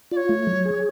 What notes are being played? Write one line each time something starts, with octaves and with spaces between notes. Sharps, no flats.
F4 C#5 D5
A3
F#3
G#4